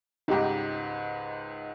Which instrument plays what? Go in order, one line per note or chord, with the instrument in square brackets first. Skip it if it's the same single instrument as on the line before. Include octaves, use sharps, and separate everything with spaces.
[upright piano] C#2 G#2 [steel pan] D#4 G4